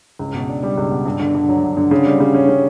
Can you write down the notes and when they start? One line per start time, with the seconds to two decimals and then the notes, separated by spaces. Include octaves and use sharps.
0.19 C#2
0.34 B2
0.49 D4
0.63 G3
0.77 C#2
0.91 B2
1.06 G2
1.20 D3
1.34 G2
1.49 F#3
1.63 G2
1.77 D3
1.91 C#3
2.06 G3
2.20 C#3
2.34 C#4
2.49 C#3